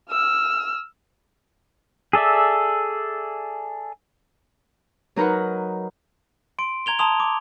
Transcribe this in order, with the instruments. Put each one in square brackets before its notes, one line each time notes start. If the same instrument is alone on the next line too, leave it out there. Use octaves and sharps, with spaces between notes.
[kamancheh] E6 F6
[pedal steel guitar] G#4 A4 D5 E5
[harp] F#3 D#4 A#4 B4 F#5
[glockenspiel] C6 D7
A#5 G#6 F7 G7
A5 A#5 C6 D#6 F7
D6